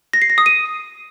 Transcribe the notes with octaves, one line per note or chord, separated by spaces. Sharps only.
A#6
C7
A#6
D#6
D#7